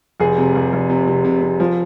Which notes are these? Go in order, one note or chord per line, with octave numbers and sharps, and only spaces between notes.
F1 G#4
C3
F1
F1
C3
C3
C3
C3
F3